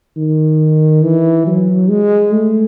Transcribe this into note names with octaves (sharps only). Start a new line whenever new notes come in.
D#3
E3
F#3
G#3
A3